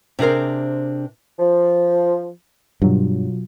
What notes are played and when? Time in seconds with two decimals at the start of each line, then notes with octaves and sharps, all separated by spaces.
0.19 C3 D4 G#4 A#4 C5
1.39 F3
2.82 G2 B2 F#3 F4